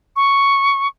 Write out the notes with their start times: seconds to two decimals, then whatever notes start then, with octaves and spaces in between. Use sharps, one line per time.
0.16 C#6